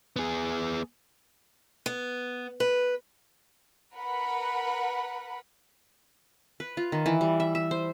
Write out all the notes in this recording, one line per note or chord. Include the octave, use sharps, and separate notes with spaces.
B3 G#4
B3
B4
A#4 B4 F#5 B5
B4
F4
D#3
E3
G3
E5
E5
C5